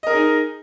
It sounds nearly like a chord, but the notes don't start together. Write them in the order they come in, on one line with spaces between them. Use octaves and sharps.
D#5 A#4 G#4 D#4